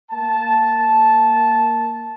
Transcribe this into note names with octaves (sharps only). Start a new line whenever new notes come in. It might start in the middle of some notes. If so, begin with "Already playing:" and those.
A#3 A5